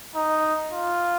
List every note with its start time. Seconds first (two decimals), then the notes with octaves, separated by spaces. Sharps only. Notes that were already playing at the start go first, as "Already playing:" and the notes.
0.16 D#4
0.70 F4